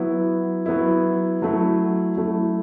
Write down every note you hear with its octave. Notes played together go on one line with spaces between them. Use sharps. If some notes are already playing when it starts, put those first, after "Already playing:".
Already playing: F#3 B3 E4
F#3 B3 E4
F#3 A3 E4
F#3 A3 E4